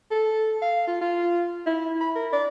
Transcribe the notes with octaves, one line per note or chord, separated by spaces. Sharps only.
A4
F5
F4
F4
E4
B5
A#4
D5